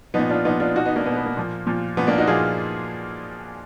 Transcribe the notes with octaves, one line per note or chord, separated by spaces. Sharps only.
A#2 F3 B3 D#4
D4 F4
A#2 F3 B3 D#4
D4 F4
B2 D#4 F#4
B3 D#4
A#3 D4
B2 B3
B3
A#3
A#2 F3
A#2 F3
A#2 F3 B3
A#3 D4
D#4 F#4
A#2 F3 F4 G#4